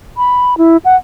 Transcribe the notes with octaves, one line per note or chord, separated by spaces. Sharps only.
B5
E4
F#5